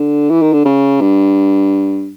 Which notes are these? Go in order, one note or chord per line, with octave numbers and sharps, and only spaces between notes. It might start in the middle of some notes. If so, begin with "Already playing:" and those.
Already playing: D3
E3
D#3
D3
C#3
G2